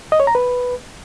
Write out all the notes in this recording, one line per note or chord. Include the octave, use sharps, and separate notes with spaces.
D#5
C#5
A#5
B4